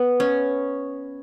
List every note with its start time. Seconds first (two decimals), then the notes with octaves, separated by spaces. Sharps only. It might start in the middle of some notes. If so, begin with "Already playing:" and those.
Already playing: B3
0.20 C#4